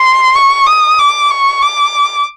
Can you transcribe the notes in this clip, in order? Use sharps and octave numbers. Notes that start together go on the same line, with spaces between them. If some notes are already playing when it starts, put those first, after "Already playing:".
Already playing: C6
C#6
D#6
D6
C#6
D6